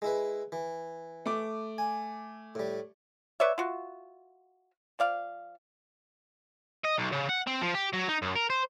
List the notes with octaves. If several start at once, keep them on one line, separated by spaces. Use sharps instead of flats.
G#3 E4 B4
E3
A3 D6
G#5
A2 G3
B4 C#5 D5 E5
F4 F#4
F3 D5 F5
D#5
B1
C#3
F#5
C4
F3
G4
F#3
D#4
F#2
A#4
C5